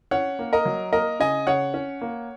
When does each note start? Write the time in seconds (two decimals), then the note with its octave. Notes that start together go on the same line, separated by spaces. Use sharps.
0.11 C#4 C#5 F#5
0.39 A#3
0.53 A#4 D#5
0.65 F#3
0.92 A#3 A#4 D#5
1.20 C#3 D#5 G#5
1.47 C#3 C#5 F#5
1.74 C#4
2.01 A#3